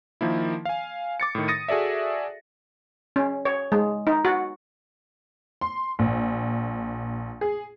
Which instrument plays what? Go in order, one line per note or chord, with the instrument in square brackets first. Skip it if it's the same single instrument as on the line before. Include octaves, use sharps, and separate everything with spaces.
[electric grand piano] D#3 F3 A#3 E4
F5 G#5
D6 A6 C#7
A2 D#3
D#6 A6 A#6 C#7 D#7
F#4 G#4 A4 D5 E5
[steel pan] C#4
C#5
G#3
D#4
F#4
[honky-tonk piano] C6
A#1
G#4